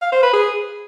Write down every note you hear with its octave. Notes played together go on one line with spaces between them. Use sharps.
F5
C5
B4
G#4